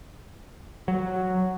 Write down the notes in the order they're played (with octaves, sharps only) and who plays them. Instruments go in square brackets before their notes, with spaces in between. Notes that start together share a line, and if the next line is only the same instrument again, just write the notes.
[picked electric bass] F#3